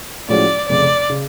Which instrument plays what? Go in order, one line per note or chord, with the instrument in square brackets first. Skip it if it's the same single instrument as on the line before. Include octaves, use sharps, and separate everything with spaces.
[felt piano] A2 F3 G#3 C#4 F#4 [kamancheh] D5
[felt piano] F1 F2 C#3 [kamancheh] D5
[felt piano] C#3